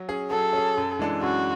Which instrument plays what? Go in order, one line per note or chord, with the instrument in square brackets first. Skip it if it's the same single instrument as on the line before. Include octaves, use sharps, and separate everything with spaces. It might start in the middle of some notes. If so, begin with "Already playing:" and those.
Already playing: [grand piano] F#3
C#4 G#4
[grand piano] F#3 [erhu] A4
[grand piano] C#4 G#4
F#2
E3 G#3 D4 A4
[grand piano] F#2 [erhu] F#4